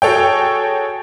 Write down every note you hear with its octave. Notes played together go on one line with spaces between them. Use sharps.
F#4 G#4 A4 C#5 G5